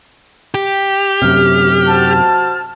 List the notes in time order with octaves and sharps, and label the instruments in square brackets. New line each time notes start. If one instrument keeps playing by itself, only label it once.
[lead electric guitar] G4
[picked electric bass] F#2 C3 [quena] F6
[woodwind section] F#4 C5 A5